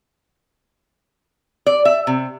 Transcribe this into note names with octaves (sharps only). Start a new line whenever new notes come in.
D5
E5
C3